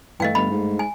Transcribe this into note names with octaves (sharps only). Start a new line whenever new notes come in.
G2 E3 A3 D#5 F5 G5
G1 D#5 B5
G#2
G#5